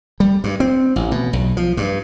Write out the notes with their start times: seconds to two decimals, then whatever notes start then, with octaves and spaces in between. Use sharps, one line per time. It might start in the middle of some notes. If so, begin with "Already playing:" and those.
0.20 G3
0.44 G2
0.60 C4
0.96 A1
1.11 B2
1.33 B1
1.57 F3
1.77 G2